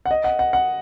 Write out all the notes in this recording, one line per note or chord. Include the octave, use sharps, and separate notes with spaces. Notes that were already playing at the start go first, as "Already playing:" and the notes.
F#5
D#5
F#5
F#5
F#5